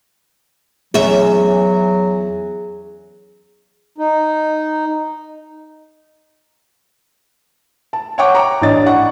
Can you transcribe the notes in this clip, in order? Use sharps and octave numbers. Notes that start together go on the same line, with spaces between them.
E2 F#3 C#4 G#4 E5
D#4
A5
C#5 E5 F#5 G5 C#6 D6
A#5 D6
A1 D4 D#5 A6
E4 F#5 C#6